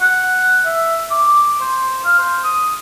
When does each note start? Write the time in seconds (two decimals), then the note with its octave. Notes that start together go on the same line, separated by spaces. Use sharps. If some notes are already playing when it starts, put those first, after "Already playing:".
0.01 F#5
0.65 E5
1.11 D6
1.60 C5
2.05 F5
2.19 C5
2.44 D#6